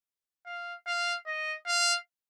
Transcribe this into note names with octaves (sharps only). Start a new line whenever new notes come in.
F5
F5
D#5
F5